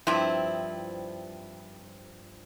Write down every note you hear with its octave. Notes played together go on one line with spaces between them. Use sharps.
G2 F3 C4 E4